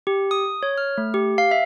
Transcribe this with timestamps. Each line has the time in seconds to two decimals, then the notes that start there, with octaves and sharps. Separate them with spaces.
0.07 G4
0.31 D#6
0.63 C#5
0.78 F6
0.98 A3
1.14 G4
1.38 F5
1.51 E5